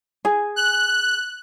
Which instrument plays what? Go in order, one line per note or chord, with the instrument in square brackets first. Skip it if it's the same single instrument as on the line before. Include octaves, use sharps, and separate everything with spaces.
[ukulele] G#4 G#5
[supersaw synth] F#6